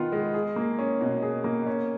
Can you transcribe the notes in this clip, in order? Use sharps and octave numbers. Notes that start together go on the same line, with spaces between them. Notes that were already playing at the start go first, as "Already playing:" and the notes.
Already playing: D#3 B3 F4
G#3
G#4
A#3
C#4
B2
G#4
A#3
C#4